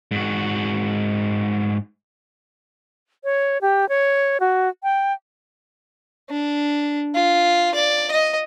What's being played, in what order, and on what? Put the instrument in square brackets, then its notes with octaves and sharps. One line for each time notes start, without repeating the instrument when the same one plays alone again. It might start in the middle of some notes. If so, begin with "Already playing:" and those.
[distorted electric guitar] G#2 F#4
[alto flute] C#5
G4
C#5
F#4
G5
[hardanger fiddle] D4
F4
D5
D#5